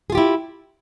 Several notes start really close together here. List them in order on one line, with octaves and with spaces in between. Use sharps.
G#4 F4 G4 E4